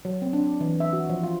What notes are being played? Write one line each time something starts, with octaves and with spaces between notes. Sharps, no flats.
F#3
C4
D4
E3
E5
F#4
F3
F4